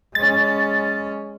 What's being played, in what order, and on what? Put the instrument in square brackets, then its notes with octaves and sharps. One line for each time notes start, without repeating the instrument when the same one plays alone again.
[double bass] G#3 C#4 [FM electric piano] A6